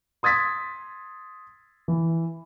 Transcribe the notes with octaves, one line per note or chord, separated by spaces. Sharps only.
C6 D#6 G#6 A6 B6
E3